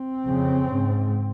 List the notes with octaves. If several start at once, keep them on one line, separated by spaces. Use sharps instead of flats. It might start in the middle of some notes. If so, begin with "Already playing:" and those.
Already playing: C4
F2 C#3
G#2